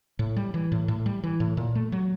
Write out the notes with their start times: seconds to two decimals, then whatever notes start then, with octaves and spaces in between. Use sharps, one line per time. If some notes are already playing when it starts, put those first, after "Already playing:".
0.19 A2
0.36 G3
0.54 E3
0.72 A2
0.88 A2
1.06 G3
1.24 E3
1.40 A2
1.57 A#2
1.75 A3
1.92 F#3